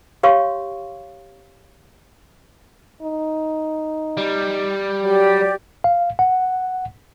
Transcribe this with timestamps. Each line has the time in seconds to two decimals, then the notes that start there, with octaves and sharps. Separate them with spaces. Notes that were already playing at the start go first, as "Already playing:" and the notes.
0.23 G4 C#5 F5 C6 C#6
3.03 D#4
4.17 G3
5.03 F#3 G4 D5
5.84 F5
6.19 F#5